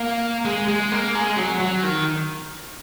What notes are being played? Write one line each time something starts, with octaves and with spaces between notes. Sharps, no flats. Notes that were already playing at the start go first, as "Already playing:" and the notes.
Already playing: A#3
G#3
G#3
A#3
G#3
F#3
F#3
D#3